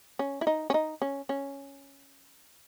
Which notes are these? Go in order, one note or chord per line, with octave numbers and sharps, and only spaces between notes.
C#4
E4
D#4
C#4
D#4
C#4
C#4